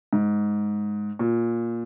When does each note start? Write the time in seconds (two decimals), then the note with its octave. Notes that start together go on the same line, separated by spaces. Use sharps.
0.13 G#2
1.19 A#2